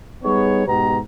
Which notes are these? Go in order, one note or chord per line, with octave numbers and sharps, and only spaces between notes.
G3 B3 D#4 G#4 C#5
G#2 B2 B3 G4 A#5